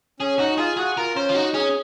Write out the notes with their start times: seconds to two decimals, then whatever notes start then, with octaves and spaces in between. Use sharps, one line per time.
0.20 C#4 G#4
0.39 D#4 F#4
0.58 F4 G#4
0.77 F#4 G#4
0.97 F4 A#4
1.16 C#4 C5
1.29 F4
1.35 D#4 F#4
1.54 C#4 G#4